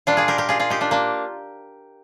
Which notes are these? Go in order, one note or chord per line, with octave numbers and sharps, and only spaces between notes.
A#2 G3 D4 F4
F4 G#4
G4 A#4
G4 A#4
F4 G#4
F4 G#4
D#4 G4
D4 F4
A#3 D4